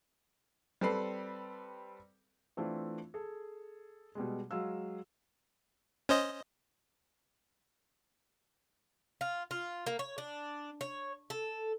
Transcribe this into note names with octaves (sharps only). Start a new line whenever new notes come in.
G3 C4 A4 B4 C7
E3 A3 C4 D4 E4 F4
G#4 A4
B2 G3 G#3
F#3 G#3 F5 E6
C#4 C5 D#5
F4
F4
A#3
C#5
D4
C#5
A4